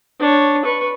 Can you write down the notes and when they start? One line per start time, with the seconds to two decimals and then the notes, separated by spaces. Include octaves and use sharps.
0.20 D4 C#5
0.65 B4 C#6